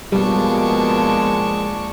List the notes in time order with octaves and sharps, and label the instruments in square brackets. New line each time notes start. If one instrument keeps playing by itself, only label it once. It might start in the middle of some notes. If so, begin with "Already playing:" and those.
[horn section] B2 [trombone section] F3 G#3 A#3 [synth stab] G3 [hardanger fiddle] D4 C#6